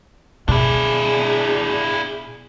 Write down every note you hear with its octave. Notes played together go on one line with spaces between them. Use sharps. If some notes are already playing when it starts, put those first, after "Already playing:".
B2 D4 E4 G#4